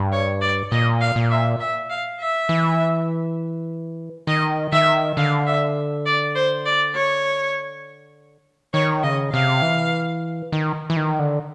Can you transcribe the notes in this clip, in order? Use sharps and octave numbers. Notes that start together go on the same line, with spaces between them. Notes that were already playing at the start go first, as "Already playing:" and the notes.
Already playing: G2
C#5
D5
A#2 D#5
F5
A#2
E5
E5
F5
E5
E3
D#3 D#5
D#3 E5
D3 F5
E5
D5
C5
D5
C#5
D#3 C#5
C#3 D#5
C3 F5
E3
D#3
E3
D#3
D3